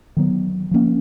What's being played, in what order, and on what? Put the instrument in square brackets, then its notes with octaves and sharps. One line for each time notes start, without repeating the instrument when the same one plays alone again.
[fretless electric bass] D#3 F#3 B3
F3 A#3 C#4